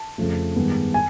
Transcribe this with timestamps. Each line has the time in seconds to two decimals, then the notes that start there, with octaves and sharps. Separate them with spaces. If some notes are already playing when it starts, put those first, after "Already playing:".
Already playing: A5
0.18 F2 C#3 F3 A3
0.56 G2 D#3 G#3 B3
0.94 G#5